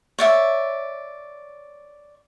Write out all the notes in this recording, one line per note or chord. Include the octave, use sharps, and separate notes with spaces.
C#5 D5 E5